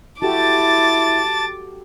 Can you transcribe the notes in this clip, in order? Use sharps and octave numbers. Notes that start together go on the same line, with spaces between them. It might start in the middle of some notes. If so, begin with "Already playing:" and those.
E4 F#4 G4 A4 A5 D6 A6